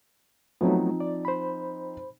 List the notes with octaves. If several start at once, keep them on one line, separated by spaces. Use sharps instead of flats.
F3 F#3 A3 B3 C4 D#4
D5
C5 B5